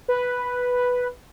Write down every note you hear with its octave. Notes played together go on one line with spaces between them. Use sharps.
B4